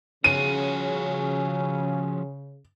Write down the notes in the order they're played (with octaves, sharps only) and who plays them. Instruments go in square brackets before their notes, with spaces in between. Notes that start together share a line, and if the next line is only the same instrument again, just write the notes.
[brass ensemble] C#3 [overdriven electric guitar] F3 F#4 [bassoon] C#4 [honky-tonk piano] D#7